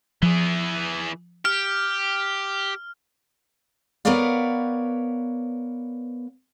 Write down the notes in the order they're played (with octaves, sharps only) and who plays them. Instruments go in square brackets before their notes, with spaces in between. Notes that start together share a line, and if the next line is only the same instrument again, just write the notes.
[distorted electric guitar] E3 G#4 [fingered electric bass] F3
[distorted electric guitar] G4 [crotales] F6
[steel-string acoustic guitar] B3 A#4 B4 C#5 D5 F5